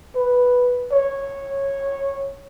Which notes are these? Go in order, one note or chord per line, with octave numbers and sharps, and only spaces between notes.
B4
C#5